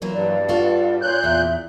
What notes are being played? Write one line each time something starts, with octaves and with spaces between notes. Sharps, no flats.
E3 F#3 A#3 A#4
G2 D5
F4 F#4 A4
A#2 C#5 F#6 G6
E2 E5